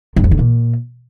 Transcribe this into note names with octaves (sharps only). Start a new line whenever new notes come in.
G2
F2
D3
A#2